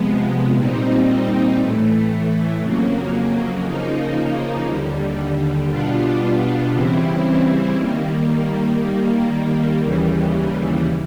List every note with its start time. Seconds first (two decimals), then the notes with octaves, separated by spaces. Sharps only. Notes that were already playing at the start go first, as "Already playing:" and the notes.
Already playing: C3 F3 G#3 B3
0.54 A#2 G3 C4 D#4
1.58 A2 E3 A3
2.61 F2 C#3 F#3 A#3
3.63 C#3 F3 A#3 D#4
4.67 D#2 D3 G3
5.70 B2 G3 B3 D4 F4
6.73 C#3 E3 G3 C4 E4
7.76 D#3 G3 A#3
8.79 D#3 G3 A#3
9.82 D#2 C#3 E3 G3